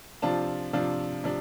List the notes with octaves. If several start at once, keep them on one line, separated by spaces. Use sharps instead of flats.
C3 F3 D4 F4 A5
C3 F3 D4 F4
C3 F3 D4